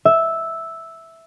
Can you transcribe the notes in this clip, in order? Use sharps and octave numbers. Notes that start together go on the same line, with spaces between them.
E5